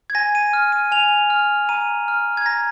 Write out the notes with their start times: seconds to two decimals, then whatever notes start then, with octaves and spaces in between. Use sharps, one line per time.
0.10 G#6
0.15 G#5 A#6
0.35 D#7
0.53 F6
0.72 D#7
0.92 G#5 F7
1.30 F6
1.69 A#5 D#7
2.08 F6
2.37 G#6
2.46 A#5 A#6